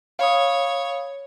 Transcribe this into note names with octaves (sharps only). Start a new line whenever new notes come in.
C#5 F5 B5 D#6